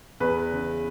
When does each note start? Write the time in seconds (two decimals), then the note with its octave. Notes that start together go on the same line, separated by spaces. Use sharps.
0.20 E2 B4
0.52 C#3